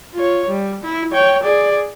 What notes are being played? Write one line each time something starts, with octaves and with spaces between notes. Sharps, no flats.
F4 C#5
G3
E4
C#5 G5
G#4 D5